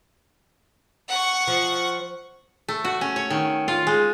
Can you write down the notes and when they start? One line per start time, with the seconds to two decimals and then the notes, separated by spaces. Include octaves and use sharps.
1.08 F#5 C#6
1.48 F3
2.68 A3
2.85 F#4
3.01 C#4
3.16 C#5
3.30 D#3
3.68 F4
3.87 G#3